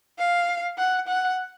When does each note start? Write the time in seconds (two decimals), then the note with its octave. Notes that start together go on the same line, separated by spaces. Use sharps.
0.18 F5
0.78 F#5
1.08 F#5